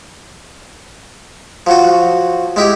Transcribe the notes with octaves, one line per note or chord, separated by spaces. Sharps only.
F3 F#3 F#4
G#3 E4 G4